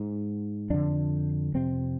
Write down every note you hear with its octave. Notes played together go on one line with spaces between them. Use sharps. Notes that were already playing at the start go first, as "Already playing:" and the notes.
Already playing: G#2
F2 D3 D4
F2 C3 C4